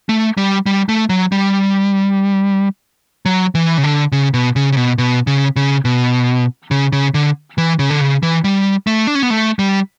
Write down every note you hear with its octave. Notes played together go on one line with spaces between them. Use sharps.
A3
G3
G3
A3
F#3
G3
F#3
E3
C#3
D3
C#3
B2
C#3
C#3
B2
B2
C#3
C#3
B2
C#3
C#3
D3
E3
C#3
D3
C#3
E3
G3
A3
D4
C#4
B3
A3
G3